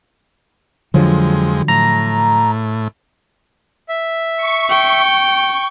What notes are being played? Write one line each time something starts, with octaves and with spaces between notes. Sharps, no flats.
F2 D3 F3 F#3 G#3
A2 A#5
E5
C#6
G5